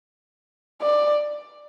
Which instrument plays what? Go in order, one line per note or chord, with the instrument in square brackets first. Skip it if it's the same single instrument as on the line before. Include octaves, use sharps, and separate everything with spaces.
[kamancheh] D5